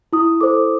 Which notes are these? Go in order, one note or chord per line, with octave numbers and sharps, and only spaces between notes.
E4 D#6
A4 C5 D6